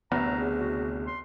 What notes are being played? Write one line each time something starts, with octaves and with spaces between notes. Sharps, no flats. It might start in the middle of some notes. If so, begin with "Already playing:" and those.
F#1 D2 C3 B3 A#5
G#4
F#4
C6